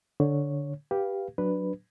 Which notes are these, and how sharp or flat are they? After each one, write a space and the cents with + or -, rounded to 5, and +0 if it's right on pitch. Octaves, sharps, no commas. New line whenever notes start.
D3 -5 C#5 +0
G4 +0 B4 -15 F5 +0
F#3 +0 D4 +0 B4 +0